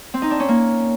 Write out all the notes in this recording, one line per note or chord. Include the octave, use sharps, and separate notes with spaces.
C4
D#4
D4
C#4
A#3